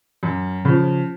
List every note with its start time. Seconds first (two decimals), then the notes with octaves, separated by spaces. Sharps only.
0.23 F#2
0.65 C#3 F3